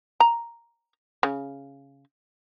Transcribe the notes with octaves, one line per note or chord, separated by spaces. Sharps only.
A#5
C#3